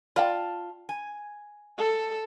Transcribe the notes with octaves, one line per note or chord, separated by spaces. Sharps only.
F4 D5 F5 G5 A5
G#5
A4